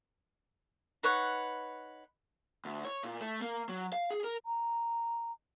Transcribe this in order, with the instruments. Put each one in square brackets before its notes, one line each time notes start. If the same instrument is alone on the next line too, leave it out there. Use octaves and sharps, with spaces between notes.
[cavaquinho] D#4 B4 C#5 F#5
[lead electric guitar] D2
C#5
A#2
A3
A#3
F#3
F5
G#4
A#4
[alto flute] A#5